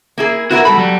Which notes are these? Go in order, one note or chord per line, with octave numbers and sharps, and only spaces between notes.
A#3 E4 G#4
B3 E4 F#4 A#4
G3 F#4 A4 B5
F#3 G3